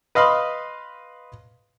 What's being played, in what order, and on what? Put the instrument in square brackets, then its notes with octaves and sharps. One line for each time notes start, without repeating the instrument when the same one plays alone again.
[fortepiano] B4 D#5 F5 B5 C6